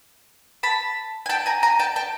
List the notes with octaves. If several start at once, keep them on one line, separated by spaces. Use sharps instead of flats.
A5 B5
G#5
G5 A5
G#5 A#5
G#5 A#5
G5 A5
G5 A5